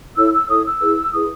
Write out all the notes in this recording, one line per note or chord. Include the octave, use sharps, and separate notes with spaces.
E4 A4 C#5 E6
E6
E4 A4 C#5 D#6
E6
E4 G#4 B4
E4 G#4 B4 D#6